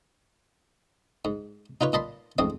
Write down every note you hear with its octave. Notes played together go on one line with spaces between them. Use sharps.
G#2
D#4 F4 B4 C#5
A#2 D#5 A5 B5 C6
A1 F2 G#2 C4 D#6